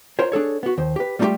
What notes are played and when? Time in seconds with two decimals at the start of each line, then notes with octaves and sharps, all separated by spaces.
0.19 F4 A#4 C5 C#5
0.32 D4 G#4 A4 C#5
0.63 B3 F#4
0.78 D#2 C5
0.96 G4 B4
1.19 G3 A3 D4 D#4 F4 G4